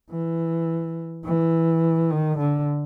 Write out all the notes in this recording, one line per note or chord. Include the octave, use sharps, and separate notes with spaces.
E3
E3
D#3
D3